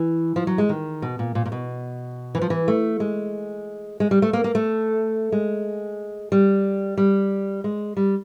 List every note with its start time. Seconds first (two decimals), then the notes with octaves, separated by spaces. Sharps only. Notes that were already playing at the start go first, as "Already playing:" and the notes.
Already playing: E3
0.36 F3
0.47 F#3
0.58 G#3
0.69 D#3
1.02 B2
1.19 A#2
1.35 A#2
1.46 A#2
1.52 B2
2.35 E3
2.42 F3
2.50 E3
2.68 A3
3.00 G#3
4.00 G#3
4.11 G3
4.22 A3
4.33 A#3
4.44 A#3
4.55 A3
5.32 G#3
6.32 G3
6.97 G3
7.64 G#3
7.97 G3